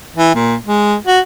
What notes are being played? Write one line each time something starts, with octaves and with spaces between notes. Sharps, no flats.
E3
A#2
G#3
F#4